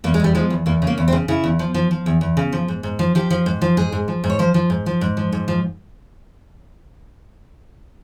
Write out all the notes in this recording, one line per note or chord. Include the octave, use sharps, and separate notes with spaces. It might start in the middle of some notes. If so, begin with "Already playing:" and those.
E2 A#3
G#3
E2 G3
F3 G#3
E2
E2 A#3
C#3
A#3
E2
C4
C#3
C#3 E4
E2
F3
F3
F3
E2
E2
C#3
F3
G#2
G#2
F3
F3 G4
F3
G#2
F3
G#2 G#4
G#2
F3
G#2
C#5
F3 C5
F3
G#2
F3
G#2
F3
G#2
F3